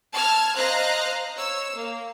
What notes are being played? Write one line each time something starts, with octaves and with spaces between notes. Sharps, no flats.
A5 E6 F6 G#6
C5 D#5 F5 A#5 F#6 A#6
C#5 E6
A#3